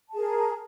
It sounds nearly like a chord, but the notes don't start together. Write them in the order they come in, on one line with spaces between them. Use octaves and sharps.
A5 G#4 A#4